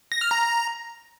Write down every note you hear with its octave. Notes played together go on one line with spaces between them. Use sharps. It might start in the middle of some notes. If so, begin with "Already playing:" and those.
A#6
F6
A#5